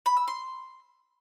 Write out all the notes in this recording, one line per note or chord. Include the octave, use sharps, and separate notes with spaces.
B5
E6
C6